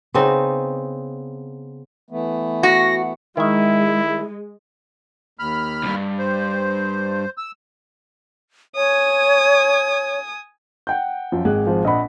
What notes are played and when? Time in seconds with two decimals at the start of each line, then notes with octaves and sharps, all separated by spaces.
0.14 C#3 B3 C4 D#4
2.10 E3 A3 B3
2.63 F#4 A#6
3.37 D#3 G#3 E4 E5
5.39 D#2 B5 F6
5.83 C2 G2
6.19 C5
7.37 E6
8.76 C#5 G#5 D#6
10.87 F#5 G5 G6
11.32 F#2 F3
11.45 G#1 G#3 F#6
11.67 F3
11.84 A#1 D#5 F#5 B5